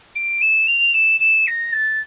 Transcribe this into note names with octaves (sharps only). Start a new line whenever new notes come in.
D7
E7
F7
E7
E7
A#6
A6